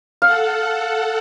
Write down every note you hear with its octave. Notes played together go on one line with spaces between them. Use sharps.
A4 F5 F#5